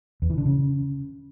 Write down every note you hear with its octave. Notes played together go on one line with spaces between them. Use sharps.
E2
E3
D3
C#3